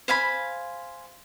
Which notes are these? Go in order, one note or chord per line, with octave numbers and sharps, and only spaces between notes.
C5 F5 G#5 B5